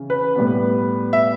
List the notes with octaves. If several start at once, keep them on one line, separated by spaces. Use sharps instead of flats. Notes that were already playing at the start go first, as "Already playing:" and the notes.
Already playing: C#3 E3
B4
A2 G3 B3
E5